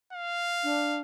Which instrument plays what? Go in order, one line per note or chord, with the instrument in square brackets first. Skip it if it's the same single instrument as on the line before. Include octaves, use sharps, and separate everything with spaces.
[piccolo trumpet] F5
[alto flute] D4